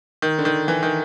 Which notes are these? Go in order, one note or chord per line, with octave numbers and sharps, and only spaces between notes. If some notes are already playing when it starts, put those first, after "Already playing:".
D#3
D3
D#3
E3
D#3